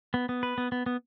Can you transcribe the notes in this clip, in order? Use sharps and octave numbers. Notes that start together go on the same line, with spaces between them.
B3
B3
B4
B3
B3
B3